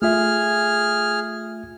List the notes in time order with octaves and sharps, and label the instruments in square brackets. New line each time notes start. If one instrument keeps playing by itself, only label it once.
[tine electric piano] A3 F4 E5 [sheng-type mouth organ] G#4 F6